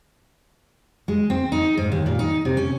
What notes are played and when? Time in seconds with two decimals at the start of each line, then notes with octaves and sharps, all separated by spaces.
1.08 G#3
1.30 C4
1.52 D#4
1.77 G#2
1.92 D#2
2.06 A#2
2.19 D#4
2.45 C3
2.57 C#4